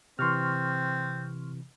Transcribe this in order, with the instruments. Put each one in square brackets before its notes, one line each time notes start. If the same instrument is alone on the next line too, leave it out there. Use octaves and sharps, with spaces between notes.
[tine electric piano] C3 E3 [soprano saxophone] C4 [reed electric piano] C6 C#6 F6